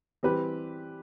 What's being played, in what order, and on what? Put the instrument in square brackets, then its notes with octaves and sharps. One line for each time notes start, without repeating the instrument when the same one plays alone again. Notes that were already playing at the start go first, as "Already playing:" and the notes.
[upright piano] E3 G3 C4 G4 B4